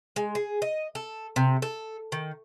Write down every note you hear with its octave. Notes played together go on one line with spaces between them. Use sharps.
G#3
G#4
D#5
A4
C3
A4
D#3